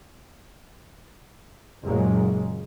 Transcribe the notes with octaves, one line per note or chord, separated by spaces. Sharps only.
F#1 A#2 C#3 F#3 G#3 A#3